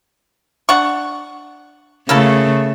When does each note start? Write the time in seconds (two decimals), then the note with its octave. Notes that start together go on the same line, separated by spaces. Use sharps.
0.69 D4 F#5 C#6
2.09 C#3 A3 A#3 E4 A4